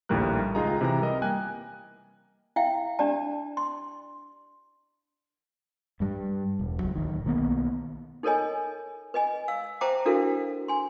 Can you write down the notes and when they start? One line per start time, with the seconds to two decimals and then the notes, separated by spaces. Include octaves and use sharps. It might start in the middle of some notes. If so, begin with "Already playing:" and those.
0.09 A#1 D#2 A2 G3 A#4 F#6
0.55 C#2 D#4 F4 G#4 D#5 A#5
0.81 C3 E3 A#5
1.01 G3 A#4 D#5
1.22 A#3 G5 G#5 F#6
2.56 E4 E5 F5 G5
2.99 D4 G4 D5 A5
3.57 C6
6.00 G2 G3
6.59 E1
6.79 C#2 F#3
6.96 D1 C#2 D#3
7.25 B1 D#3 A#3 B3
8.23 D#4 A4 A#4 C#5 D#5 G#5
9.14 B4 D#5 G#5
9.48 F5 E6
9.81 C5 E5 G5 A5 A#5 D6
10.05 D4 E4 F#4 A4 A#4 F5
10.68 G#5 C6